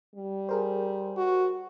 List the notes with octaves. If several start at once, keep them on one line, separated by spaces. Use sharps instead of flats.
G3
G#4 A#4 C5
F#4